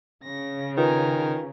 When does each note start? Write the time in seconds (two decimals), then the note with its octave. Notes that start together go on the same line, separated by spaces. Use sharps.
0.24 C#3 A#6
0.78 D#3 F4 B4 G#5 A#5